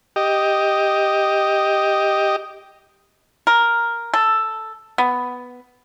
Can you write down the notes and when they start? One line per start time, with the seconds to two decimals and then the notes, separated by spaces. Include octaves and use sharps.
0.16 G4 D#5
3.47 A#4
4.14 A4
4.98 B3